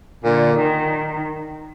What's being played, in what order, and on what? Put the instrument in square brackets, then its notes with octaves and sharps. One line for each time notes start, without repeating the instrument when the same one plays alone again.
[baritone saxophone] A#2 [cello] D3
[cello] D#3